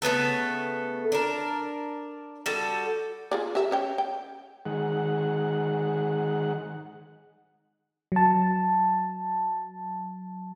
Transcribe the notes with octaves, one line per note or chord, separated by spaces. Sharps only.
C#3 A3 B3 A4
D4 A#4
G3 F#4 A4
F4 G#4 D5
G4 A#4 E5
C#4 C#5 G5
G5
D#3 G#3 F#5
F#3 A5